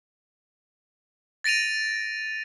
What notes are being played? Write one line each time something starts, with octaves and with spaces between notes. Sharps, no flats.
A6 A#6 D7 D#7 F7